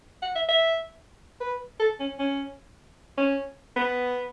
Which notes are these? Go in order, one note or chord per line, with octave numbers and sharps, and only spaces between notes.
F#5
E5
E5
B4
A4
C#4
C#4
C#4
B3